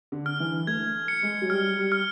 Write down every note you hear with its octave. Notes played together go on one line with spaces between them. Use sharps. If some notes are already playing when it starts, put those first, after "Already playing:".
D3
F6
E3
A3 G#6
C#7
G#3
F#3
G3 F6
G3
F6